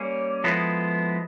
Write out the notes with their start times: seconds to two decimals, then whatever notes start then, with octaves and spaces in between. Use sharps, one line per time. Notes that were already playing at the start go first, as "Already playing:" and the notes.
Already playing: G3 A#3 C#4
0.44 F3 G#3 B3 E4 A4